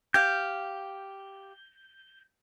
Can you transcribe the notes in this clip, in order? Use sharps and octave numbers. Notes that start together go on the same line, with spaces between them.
G4 F5 G6